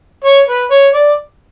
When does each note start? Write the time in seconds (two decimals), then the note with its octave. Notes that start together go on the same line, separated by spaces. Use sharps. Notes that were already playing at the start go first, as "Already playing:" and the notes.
0.24 C#5
0.48 B4
0.71 C#5
0.94 D5